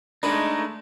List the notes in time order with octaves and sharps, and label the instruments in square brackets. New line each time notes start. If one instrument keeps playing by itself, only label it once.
[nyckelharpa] G#3 A3 [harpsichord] D4 B4 [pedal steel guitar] D#4